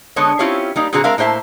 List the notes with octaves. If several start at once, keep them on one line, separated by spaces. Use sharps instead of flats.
D3 G#3 B3 A4 C#5
C4 C#4 E4 F4 G4 C#5
G3 A#3 D#4
A#2 D3 C4 F#4 G#4 A#5
G#3 C4 A#4 E5 F5
A2 A#3 C5 E5 A5